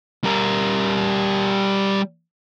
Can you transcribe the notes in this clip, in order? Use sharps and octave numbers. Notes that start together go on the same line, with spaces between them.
G3 A#4